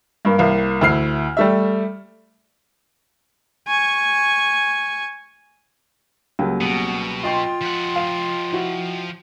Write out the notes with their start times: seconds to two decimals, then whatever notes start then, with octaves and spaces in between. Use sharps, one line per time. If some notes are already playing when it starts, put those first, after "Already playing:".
0.25 G2 A#3
0.38 C2 A#3 F5
0.81 D2 E4 F6 C7
1.37 G3 A3 E5
3.68 G#5 C#6
6.39 C#2 F#3 G3 A#3 G4
6.61 B2 B3
7.23 F4 D#5 G5 C6
7.61 F3 F#5
7.96 F5
8.52 E4 F#4